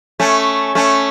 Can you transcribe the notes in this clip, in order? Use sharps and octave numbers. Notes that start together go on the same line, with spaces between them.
A3 C#4
A3 C#4